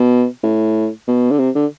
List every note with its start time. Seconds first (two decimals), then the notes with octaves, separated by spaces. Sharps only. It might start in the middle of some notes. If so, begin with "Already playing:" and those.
Already playing: B2
0.43 A2
1.07 B2
1.31 D3
1.39 C3
1.55 D3